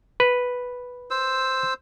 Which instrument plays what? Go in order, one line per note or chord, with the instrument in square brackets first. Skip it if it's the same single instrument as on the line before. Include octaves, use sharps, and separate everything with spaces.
[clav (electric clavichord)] B4
[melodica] C5 E6